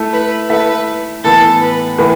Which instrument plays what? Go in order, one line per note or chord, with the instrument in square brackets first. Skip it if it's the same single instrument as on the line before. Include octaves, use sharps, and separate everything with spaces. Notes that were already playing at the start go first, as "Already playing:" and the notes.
Already playing: [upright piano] A3 E4 A4 E5
[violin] B4
[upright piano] A3 E4 A4 E5 [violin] B4
[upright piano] A2 E3 B3 [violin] A4
[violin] B4
[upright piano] A2 E3 B3